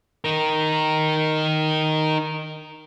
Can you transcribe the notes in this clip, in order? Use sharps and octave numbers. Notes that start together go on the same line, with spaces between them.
D#4 A#4